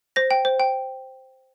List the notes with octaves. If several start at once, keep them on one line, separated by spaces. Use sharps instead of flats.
C5 A#6
G5
C5
G5